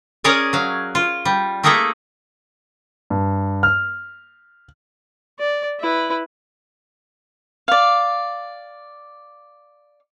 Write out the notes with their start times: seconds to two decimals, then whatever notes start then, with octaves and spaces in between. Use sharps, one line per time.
0.24 C#4 G#4 A#4 C#5 D5
0.53 F#3 F5
0.95 F4
1.25 G3
1.63 A3 A#3 D#4 G#4 A4 E5
3.10 G2
3.63 F6
5.39 D5
5.80 E4 B4
7.68 D5 F5